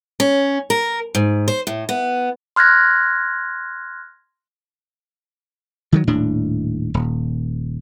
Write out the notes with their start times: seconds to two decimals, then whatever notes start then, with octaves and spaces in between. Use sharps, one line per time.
0.20 C#4
0.70 A#4
1.15 G#2
1.48 C5
1.67 A2
1.89 B3
2.56 C6 F6 F#6 G#6 A#6
5.92 D#3 F3 F#3
6.07 D#1 A2 D4
6.94 D#1